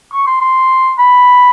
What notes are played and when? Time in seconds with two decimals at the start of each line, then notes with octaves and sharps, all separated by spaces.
0.12 C#6
0.27 C6
0.41 C6
0.98 B5